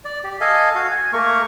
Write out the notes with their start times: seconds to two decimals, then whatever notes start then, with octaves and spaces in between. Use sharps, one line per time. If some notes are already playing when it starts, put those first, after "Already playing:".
0.05 D5
0.24 G4
0.41 A4 D#5 F5 G#5
0.75 F#4 F5
0.91 G#5
1.13 A3 A#3 A#4 C#6